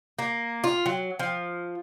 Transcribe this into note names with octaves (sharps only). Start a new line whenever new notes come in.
A#3
F4
F#3
F3